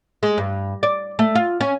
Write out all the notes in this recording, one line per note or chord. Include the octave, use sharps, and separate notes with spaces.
G#3
G2
D5
A3
F4
C#4